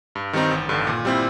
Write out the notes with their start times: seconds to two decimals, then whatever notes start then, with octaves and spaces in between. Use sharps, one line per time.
0.15 G2
0.33 D#3 G3 C4 D#4
0.51 A1
0.69 G2 D3
0.87 A#2
1.05 G3 C4 E4